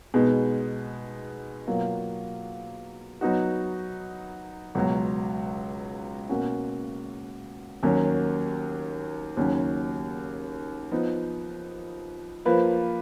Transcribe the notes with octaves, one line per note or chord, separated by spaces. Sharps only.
B2 G#3 B3 D#4
B2 F#3 A#3 F4
F#3 B3 D#4 F#4
C#2 B2 F#3
B2 A#3 C#4 F#4
D#2 D#3 F#3 C#4
D#2 C#3 F#3 C#4
F3 B3 D#4
F3 A#3 F4 B4